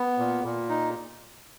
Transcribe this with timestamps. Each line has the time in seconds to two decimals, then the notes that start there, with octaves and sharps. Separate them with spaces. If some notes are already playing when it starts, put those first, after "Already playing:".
Already playing: B3
0.18 A#2
0.44 A#2
0.69 D#4